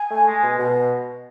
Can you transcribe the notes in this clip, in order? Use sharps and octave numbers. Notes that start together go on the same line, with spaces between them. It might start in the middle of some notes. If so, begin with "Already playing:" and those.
Already playing: G#5
A3
G#3
B2
B2